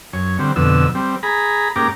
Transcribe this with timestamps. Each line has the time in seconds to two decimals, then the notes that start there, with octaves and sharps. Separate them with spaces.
0.13 F#2 C#5
0.39 D3 G3 C4
0.56 F2 B2 D3 E6
0.95 G3 C4
1.23 G#4 A#5 B5
1.76 G#2 A#3 C#4 G4 A#5 D6